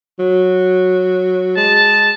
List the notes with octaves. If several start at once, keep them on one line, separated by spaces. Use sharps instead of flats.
F#3
G#3 A5